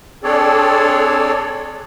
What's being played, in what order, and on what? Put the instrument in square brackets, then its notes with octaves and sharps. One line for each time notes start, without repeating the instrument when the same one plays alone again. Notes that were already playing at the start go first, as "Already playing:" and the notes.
[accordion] C4 D4 G#4 A4 C#5 D5